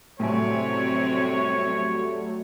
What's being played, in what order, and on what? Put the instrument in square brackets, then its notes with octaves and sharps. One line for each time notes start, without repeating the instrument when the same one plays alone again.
[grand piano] A2 G#5 [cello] C3 C4 [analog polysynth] F#3 G3 A3 [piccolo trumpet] C#5